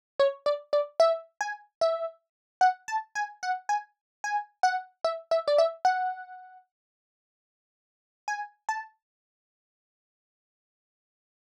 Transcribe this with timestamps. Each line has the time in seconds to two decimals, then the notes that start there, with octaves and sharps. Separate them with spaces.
0.19 C#5
0.46 D5
0.73 D5
1.00 E5
1.41 G#5
1.81 E5
2.61 F#5
2.88 A5
3.15 G#5
3.43 F#5
3.69 G#5
4.24 G#5
4.63 F#5
5.04 E5
5.31 E5
5.48 D5
5.58 E5
5.85 F#5
8.28 G#5
8.69 A5